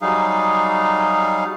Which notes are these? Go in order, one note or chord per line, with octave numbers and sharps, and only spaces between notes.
F#3 G3 D#4 G#4 F5